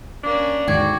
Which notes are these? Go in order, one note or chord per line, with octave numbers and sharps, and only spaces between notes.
A#3 C#4 D4
D#2 G#2 D3 F#4 G5 D6 G#6